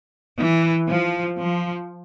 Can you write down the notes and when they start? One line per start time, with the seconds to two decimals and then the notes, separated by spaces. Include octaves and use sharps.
0.37 E3
0.88 F3
1.37 F3